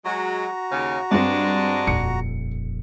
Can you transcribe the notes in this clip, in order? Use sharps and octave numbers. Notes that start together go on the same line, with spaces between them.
F#3 G#3 F#4 A#5
D#2 C#3
G2 G#3 C4 D4
D#1 F2 C#7